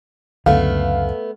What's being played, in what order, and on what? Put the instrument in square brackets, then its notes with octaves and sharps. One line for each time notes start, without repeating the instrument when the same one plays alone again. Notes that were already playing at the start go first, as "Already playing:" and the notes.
[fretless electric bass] C#2 F#2 D3 [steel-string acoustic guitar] A3 B3 [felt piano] F5